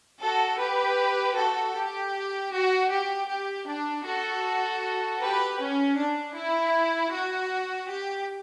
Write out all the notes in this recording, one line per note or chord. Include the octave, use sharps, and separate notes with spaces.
F#4 A4
G4 B4
F#4 A4
G4
F#4
G4
G4
D4
F#4 A4
G4 B4
C#4
D4
E4
F#4
G4